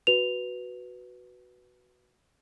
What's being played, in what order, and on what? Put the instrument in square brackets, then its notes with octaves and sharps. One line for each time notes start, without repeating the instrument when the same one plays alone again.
[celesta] F#4 B4 F7